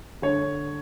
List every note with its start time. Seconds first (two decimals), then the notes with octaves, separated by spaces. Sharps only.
0.22 D3 C#5